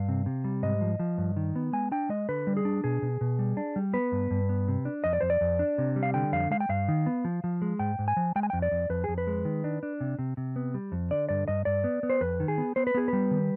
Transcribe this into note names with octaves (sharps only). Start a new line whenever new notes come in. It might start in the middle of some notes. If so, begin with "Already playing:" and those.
Already playing: G2 F5
C3
C3
G3
G#2 D#5
F3
F3
G2
D#3
B3
G#3 G#5
D4 G5
G#3 D#5
D3 B4
G3
G#4
D4
B2 G#4
B2
B2
G3
D4
G3
B3 B4
G2
G2
B3
C3
D4
F2 D#5
D5
F2 C5
D5
F2
D4
C3
G3
F5
D3 G5
F2 F5
G#3 F5
G5
G2 F5
D#3
B3
F3
F3
G#3
G#2 G5
G#2
G#5
F3
G#3 G5
G#5
F2 G5
D5
F2
F2 B4
F2 G#4
B4
G#3
D#3
D4
D4
C3
C3
C3
B3
G3
F2
D3 D5
G2 D5
G2 D#5
G2 D5
B3
B3
C5
F2 B4
D#3
G#4
B3
B3 C5
B4
B3 G#4
G3 B4
D#3